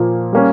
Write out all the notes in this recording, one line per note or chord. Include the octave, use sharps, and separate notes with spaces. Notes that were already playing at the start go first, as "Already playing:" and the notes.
Already playing: A#2 F3 A#3
G3 A#3 C#4